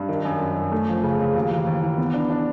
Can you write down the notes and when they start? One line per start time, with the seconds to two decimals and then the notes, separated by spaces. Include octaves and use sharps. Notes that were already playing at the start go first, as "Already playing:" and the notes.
Already playing: G2
0.09 D#3
0.25 F#2
0.40 F#2
0.56 F#2
0.72 A3
0.88 F3
1.03 C#3
1.19 C#3
1.35 D#2
1.51 E3
1.67 D#2
1.82 E3
1.98 B3
2.14 D4
2.30 D4